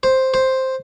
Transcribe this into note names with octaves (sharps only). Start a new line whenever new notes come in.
C5
C5